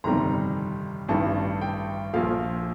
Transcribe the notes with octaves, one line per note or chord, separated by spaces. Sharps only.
G1 F2 C3 D#3 G3 A#5
A1 G2 D#3 G3 A5
G5
A#1 A#2 F3 F5